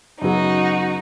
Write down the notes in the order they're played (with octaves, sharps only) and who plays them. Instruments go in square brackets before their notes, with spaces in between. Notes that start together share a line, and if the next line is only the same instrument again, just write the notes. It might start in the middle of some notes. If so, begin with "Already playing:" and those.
[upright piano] F#2 C#3 F#3 B3 [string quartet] D#4 F#4